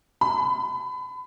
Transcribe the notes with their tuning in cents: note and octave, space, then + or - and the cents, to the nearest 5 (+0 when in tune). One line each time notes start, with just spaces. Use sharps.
B5 +30